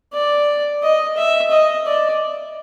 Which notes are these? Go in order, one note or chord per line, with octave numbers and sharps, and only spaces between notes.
D5
D#5
E5
D#5
D5